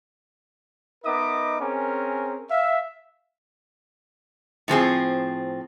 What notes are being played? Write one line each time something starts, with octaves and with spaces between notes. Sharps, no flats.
B3 D#4 A#4 D#5 E5 D6
C4 C#4 G#4 A#4
E5 F5
A2 F3 C4 G#4